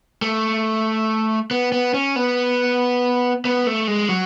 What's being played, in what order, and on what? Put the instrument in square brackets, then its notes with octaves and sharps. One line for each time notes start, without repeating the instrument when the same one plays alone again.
[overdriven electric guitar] A3
B3
B3
C#4
B3
B3
A3
G#3
F#3